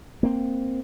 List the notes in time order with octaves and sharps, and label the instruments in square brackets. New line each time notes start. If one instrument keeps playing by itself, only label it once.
[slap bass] A#3 C4